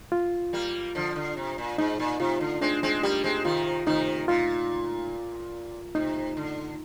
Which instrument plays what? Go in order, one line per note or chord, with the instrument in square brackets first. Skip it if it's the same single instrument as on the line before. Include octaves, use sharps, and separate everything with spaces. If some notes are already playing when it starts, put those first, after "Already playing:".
[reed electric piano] F4
[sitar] G3 A#3
D3 F3
D3
C3
A#2
[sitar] G#2 [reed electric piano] D#4
[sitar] A#2
[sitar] C3 [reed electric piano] F4
[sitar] D3
[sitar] G#3 C4 [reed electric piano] D4
[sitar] G#3 C4
[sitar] G3 A#3 [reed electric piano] G4
[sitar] G#3 C4
[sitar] C3 D#3 [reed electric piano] F4
[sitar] C3 D#3 [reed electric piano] D#4
[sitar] A#2 [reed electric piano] F4
[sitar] C3 [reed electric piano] D#4
[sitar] D3